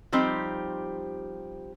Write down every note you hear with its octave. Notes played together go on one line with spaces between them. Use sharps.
F3 G3 C4 D#4 G4